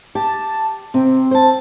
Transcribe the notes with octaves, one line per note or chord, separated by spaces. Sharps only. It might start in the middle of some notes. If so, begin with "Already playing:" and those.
G4 A5
C3 C4
C5 A5